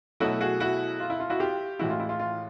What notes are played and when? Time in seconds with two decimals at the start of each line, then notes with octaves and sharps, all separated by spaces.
0.20 B2 F#3 A3 E4 F#4
0.40 F#4 G#4
0.60 E4 F#4
1.00 F4
1.10 E4
1.20 F4
1.30 E4 F#4
1.40 F4 G4
1.79 A2 E3 G#3 E4 F#4
1.90 F4
2.00 E4
2.09 F4
2.19 F4